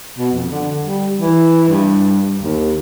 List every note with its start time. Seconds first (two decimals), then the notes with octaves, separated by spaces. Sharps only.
0.18 B2
0.32 F2
0.50 D3
0.83 G3
1.20 E3
1.69 G2
2.42 D#2